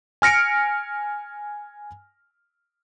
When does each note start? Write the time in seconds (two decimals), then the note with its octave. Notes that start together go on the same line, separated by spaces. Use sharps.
0.22 G#5 F6 A#6 C#7 D7